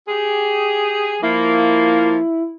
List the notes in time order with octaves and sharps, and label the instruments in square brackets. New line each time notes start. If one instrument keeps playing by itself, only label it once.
[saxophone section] G4 G#4
[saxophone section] F3 A#3 [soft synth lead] E4